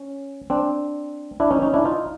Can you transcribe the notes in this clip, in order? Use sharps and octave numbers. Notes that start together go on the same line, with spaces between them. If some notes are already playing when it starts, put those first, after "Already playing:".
Already playing: C#4
C4 D4
D4 E4
C#4 D#4
C#4 D#4
D4 E4
D#4 F4